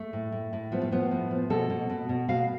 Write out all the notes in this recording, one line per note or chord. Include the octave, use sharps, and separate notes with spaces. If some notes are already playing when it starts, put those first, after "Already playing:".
Already playing: A3
A2
A2
A2
F3 B3
A3
F3 B3
A2
F3
B2 A4
B2
B2
B2
B2 F5